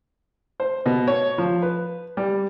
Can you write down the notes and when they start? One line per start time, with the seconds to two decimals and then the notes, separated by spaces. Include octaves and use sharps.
0.60 C5
0.86 B2
1.08 C#5
1.38 F3
1.62 B4
2.17 G3